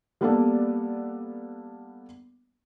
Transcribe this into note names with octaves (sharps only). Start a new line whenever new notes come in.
G3 A#3 B3 D4 A4 D5